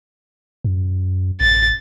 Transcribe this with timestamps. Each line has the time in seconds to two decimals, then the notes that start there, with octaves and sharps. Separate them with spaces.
0.64 F#2
1.41 A1 A6